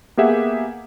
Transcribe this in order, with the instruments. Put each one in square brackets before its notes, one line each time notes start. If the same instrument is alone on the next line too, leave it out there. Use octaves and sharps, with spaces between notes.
[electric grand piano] A#3 B3 G4 G#4 E5 F#5